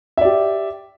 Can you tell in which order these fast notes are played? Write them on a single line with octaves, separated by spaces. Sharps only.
E5 D5 G4